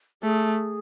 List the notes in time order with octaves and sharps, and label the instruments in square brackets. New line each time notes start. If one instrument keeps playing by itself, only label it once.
[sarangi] A3 [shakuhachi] G#4